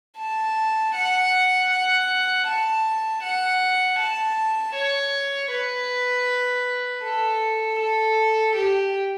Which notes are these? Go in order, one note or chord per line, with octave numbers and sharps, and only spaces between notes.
A5
F#5
F#5
A5
F#5
A5
C#5
B4
A4
A4
G4